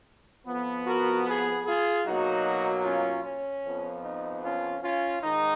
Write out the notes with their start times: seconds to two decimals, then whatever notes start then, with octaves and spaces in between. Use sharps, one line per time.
0.47 F2 F3 B3
0.86 F#4 A#4
1.26 G#4 B4
1.65 F4 G#4
2.05 B2 F#3 A#3 D#4 F#4
2.85 C#4 F4
3.24 C#4
3.64 F2 F3 B3
4.04 D#4
4.43 C#4 F4
4.83 C#4 F4
5.23 G#2 D#3 D#4